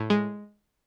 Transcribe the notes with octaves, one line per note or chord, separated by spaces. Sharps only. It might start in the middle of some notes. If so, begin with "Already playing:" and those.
Already playing: A2
G#3